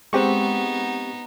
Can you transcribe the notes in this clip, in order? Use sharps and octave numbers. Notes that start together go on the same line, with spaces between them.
G#3 B3 C4 D#4 G4 F#5 C#6